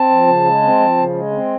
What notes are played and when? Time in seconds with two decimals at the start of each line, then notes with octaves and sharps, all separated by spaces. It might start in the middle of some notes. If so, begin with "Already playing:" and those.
Already playing: C4 A5
0.10 F3
0.27 C#3
0.45 G#3
0.62 C4
0.79 F3
0.97 C#3
1.14 G#3
1.32 C4